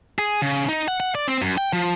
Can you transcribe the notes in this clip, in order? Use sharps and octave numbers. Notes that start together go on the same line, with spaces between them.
G#4
C#3
D#4
F#5
F#5
D5
C4
F#2
G5
F3